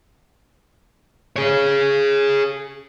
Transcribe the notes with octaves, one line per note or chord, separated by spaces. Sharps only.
G#4 C#5